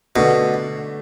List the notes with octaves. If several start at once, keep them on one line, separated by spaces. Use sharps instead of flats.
B2 D3 A3 D4 A4